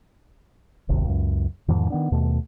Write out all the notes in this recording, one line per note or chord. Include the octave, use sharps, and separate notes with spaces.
D#1 G#1 D#2 C3
C#2 F#2
E2 G#2 D#3 F3
D#3 B3 D4
D#2 B2 A3